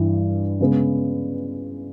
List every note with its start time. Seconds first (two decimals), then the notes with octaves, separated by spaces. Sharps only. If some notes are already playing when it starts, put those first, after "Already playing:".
Already playing: G2 E3 G3
0.60 C#3 G#3 B3